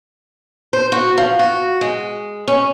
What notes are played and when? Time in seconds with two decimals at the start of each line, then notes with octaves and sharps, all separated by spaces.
0.73 C5
0.92 F#4
1.18 F3
1.39 F#4
1.81 G#3
2.48 C#4